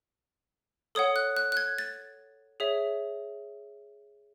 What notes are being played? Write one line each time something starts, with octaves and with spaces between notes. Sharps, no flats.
A4 C#5 F#5 D#6
F#6
F#6
F#6
G#6
A6
G#4 C#5 E5